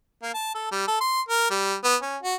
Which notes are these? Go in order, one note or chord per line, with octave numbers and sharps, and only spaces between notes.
A#3
A5
A4
G3
A4
C6
A#4
G3
B3
C#4
F#4